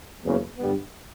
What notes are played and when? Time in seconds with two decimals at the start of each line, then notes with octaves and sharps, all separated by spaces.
0.23 F#1 E2 C#3
0.58 G2 D3 G3 B3